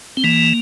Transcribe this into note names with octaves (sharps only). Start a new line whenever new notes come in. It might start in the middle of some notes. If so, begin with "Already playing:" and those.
C4
E3 A#3